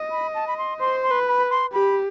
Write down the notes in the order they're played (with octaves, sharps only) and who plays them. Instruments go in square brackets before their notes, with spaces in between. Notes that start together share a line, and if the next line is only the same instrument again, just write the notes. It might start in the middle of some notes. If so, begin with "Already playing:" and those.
Already playing: [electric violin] D#5
[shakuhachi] B5
A5
B5
C6
[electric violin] C5 [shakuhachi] C6
[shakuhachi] C6
[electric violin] B4
[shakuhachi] B5
C6
[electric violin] G4 [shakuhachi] B5